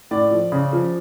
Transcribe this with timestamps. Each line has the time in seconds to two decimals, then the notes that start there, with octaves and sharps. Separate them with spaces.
0.11 A2 D5
0.31 F3
0.52 C#3
0.73 F3